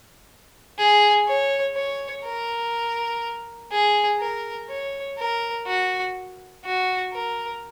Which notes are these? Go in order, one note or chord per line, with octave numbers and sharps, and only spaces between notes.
G#4
C#5
C#5
A#4
G#4
A#4
C#5
A#4
F#4
F#4
A#4